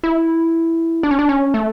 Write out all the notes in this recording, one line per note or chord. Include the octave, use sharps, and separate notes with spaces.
E4
D4
C#4
D4
C#4
A3